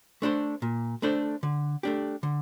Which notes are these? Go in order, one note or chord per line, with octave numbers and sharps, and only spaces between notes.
A3 D4 A4 C5
A#2
A3 D4 A4 C5
D3
A3 D4 G4
D3